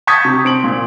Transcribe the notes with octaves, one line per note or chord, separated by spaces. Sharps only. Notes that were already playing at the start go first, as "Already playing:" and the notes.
A5 C#6 D#6 G6 G#6 B6
C3
C4 D7 F#7
A#2